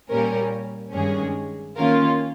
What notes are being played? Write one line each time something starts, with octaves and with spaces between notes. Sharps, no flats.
A#2 G3 A#3 C#4 A#4
G2 D#3 G#3 C#4 G#4
D#3 A#3 C#4 F4 A#4